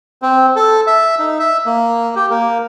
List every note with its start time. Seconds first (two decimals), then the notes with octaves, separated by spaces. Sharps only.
0.22 C4
0.56 A4
0.87 E5
1.19 D#4
1.39 E5
1.66 A#3
2.16 G4
2.30 A#3